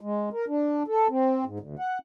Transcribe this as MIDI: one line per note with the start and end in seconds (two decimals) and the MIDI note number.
0.01 0.29 56
0.33 0.45 70
0.48 0.83 62
0.88 1.08 69
1.09 1.44 60
1.45 1.59 44
1.60 1.76 38
1.79 1.98 78